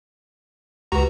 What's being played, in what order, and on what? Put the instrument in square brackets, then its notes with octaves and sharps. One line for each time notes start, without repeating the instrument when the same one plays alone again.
[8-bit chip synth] C#2 F#4 A#5 [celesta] G4 B4